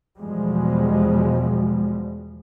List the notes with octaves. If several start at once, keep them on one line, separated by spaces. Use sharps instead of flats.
E2 B2 F3 G3 G#3